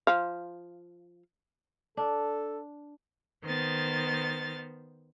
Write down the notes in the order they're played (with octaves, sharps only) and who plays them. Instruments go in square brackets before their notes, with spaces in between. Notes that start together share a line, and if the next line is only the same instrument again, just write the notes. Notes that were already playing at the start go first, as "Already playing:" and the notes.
[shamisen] F3 F5
[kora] D4 [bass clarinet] A4
[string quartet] D#3 B3 C5 F6 A6